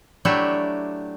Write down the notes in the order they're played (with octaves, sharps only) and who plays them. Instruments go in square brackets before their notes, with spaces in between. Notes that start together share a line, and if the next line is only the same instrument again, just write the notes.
[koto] F#3 A3 D4 E4 G4